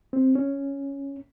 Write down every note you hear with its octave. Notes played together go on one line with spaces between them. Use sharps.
C4
C#4